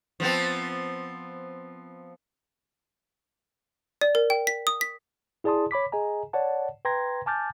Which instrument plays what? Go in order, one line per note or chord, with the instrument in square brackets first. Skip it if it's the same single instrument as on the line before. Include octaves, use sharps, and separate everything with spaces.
[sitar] F3 B3 C4
[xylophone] D5
A#4
G5
B6
D#6
B6
[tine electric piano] E4 G#4 D5 A5 C6 D#6
C#5 B5 D6 B6
G#4 D#5 G#5 A#5
C#5 D5 F#5 A5
B4 G5 A#5 C6 G#6 A#6
G#5 A5 D6 F6 G6 A6